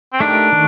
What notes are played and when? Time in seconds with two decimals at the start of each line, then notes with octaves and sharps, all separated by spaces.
0.13 C4
0.20 A3 D4 D#4 G4 A#4
0.52 D#3 A3